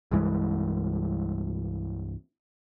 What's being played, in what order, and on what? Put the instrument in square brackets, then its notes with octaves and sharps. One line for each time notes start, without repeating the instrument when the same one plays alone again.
[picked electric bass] C2 G2 E3 G#3